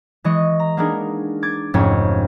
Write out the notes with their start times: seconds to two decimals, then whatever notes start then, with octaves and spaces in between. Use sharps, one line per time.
0.24 E3 G#3 D#5 C#6
0.60 A#5
0.77 A#3 B3 D4 D#4 G#4 A#4
1.43 D6 G#6 A6
1.74 F1 F2 G#2 A3 C#4 C#5